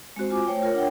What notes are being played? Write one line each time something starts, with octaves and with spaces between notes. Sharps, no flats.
G#3 C4 F#4 C5
F4 G#5 D6
A3 C5 C#5 G5
F4 A#4 C#5
D4 F#5 G5